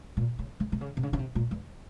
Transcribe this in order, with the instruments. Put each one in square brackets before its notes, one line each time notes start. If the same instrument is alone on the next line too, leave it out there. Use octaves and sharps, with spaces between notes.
[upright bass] A#2
C#3
C#3
C3
C#3
C3
C#3
C#3
C3
A#2
E2